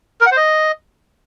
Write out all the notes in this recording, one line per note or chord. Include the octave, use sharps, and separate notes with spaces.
A#4
F#5
C5
D#5